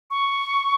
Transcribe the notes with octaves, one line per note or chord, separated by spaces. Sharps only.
C#6